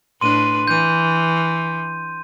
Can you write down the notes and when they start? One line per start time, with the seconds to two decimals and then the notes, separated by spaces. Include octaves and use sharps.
0.21 A2 D4 B4 C6 D#7
0.68 E3 G6 D#7